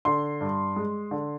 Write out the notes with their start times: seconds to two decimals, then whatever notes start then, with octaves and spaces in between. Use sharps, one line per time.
0.05 D3 C6
0.41 G2
0.76 G#3
1.11 D3